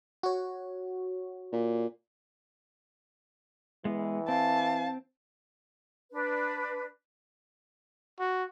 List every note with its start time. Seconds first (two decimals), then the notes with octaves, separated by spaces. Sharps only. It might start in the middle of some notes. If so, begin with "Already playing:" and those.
0.23 F#4 C#5
1.52 A#2
3.85 E3 G#3 B3
4.28 C4 F5 A5
6.11 D4 B4
8.20 F#4